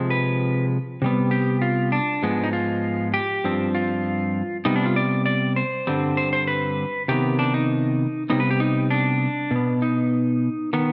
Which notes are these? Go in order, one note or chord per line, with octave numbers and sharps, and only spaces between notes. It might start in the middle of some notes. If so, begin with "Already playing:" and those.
Already playing: C3 F3 G#3 C4
B4
C3 G3 B3
G4
F4
D4
G#2 F3 G#3 B3
D#4
F4
G4
G2 F3 C4
F4
C3 G3 B3 D#4
D4
F4
D5
D5
C5
G2 D3 G3 C4
C5
C5
B4
C3 D#3 B3 G4
D4
D#4
C3 G3 B3 D#4
B4
G4
D#4
D4
B2 B3
D#4
D#3 B3